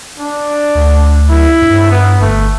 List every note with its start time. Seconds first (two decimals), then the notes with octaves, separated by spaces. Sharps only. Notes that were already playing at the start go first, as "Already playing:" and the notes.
0.19 D4
0.75 D2
1.29 E4
1.62 G2
1.92 B3
2.21 G1 A3